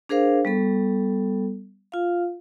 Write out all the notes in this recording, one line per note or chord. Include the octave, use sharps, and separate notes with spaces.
D4 G#4 A#4 C5 F5
G3 B3 A4
F4 F5